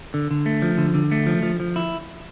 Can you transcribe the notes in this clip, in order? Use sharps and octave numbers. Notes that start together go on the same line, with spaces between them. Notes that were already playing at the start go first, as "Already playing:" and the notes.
D3
D3
A3
F3
D3
D3
A3
F3
F3
F3
E4